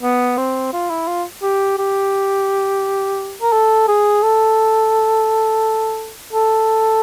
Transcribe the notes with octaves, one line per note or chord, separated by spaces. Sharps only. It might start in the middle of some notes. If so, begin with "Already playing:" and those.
B3
C4
F4
E4
F4
G4
G4
A#4
A4
G#4
A4
A4